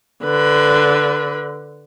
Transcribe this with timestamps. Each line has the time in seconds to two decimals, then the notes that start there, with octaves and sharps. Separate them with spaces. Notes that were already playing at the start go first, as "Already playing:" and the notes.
0.24 D3 B4